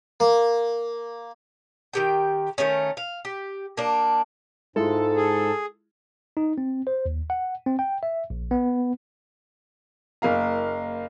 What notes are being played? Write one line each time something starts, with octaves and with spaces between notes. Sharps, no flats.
A#3
D#3 G4 G5
D#3 G3 A3 C#4
F5
G4
A#3 D4
G#2 G#3 E4 F4 A4
G#4
D#4
C4
C5
D#2
F#5
C4
G5
E5
A#1
B3
F#1 A#3 F5 A#5